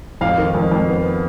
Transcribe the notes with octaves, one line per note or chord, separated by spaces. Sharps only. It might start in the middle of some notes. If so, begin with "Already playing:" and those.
F2 F5
D#3
F2
F2
B3